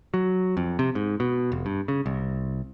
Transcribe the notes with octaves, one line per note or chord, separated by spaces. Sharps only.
F#3
F2
C3
G#2
B2
F1
G2
C#3
C2